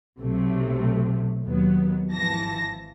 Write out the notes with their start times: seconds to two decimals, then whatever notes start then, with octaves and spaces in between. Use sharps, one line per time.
0.20 B1 C3 F#3 A3
1.43 D#2 F#3 B3
2.09 G#1 E3 F3 A5 A#6